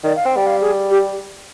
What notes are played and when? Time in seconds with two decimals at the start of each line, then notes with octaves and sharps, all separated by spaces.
0.04 D#3 D5
0.16 F5
0.25 C4 G5
0.37 G3 G5
0.47 F5
0.61 G#4
0.90 G4